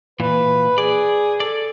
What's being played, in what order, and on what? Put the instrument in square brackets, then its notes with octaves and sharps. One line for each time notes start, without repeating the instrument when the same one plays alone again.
[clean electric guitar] A#2 E3 [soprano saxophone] B4
[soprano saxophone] G#4 [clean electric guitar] D5
[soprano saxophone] A4 [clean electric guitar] D5